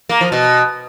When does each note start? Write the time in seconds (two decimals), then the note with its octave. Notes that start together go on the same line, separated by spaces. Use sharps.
0.09 A#3
0.21 F3
0.32 B2